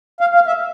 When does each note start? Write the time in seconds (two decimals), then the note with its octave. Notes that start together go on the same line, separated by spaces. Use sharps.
0.21 F5
0.35 F5
0.47 E5